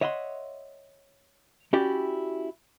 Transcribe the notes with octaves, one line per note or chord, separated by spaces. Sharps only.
C#5 D#5 E5 F#5 B5 C6
C#4 E4 F#4 G4 D5